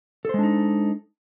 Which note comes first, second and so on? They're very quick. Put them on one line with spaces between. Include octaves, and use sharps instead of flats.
A4 C5 G#3 D4 D#4